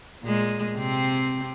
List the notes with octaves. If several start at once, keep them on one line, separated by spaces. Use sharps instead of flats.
A#2 G#3
C3 C4